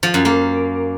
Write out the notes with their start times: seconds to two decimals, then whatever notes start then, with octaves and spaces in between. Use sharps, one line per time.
0.03 F3
0.14 F#2
0.25 A#3